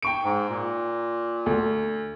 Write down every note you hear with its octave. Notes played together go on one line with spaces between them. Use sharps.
G5 C#6 D7
G#2
A#2
D2